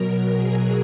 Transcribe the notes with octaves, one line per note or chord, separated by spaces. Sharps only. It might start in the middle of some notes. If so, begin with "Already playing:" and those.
Already playing: B2 F#3 A#4
G#4